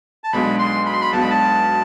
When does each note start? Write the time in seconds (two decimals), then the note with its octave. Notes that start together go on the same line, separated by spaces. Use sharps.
0.24 A5
0.32 B1 B2 G#3 D4 B5
0.59 C6
0.86 B5
0.93 C6
1.01 B5
1.12 B1 B2 G#3 D4 A5
1.22 B5
1.30 A5